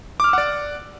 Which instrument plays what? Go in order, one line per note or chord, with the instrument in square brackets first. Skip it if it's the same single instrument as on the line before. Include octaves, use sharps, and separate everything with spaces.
[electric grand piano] D6
F6
E6
F#5
D5